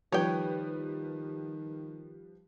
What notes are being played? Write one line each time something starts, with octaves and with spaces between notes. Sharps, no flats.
D#3 F3 G3 B4 C#5 G5